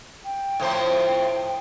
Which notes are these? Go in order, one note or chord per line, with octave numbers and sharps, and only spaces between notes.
G5
A2 F3 C5